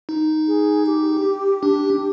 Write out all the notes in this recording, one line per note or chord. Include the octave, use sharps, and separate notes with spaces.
D#4
G#4
G4
D4